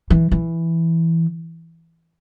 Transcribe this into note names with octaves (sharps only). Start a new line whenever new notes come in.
E3
E3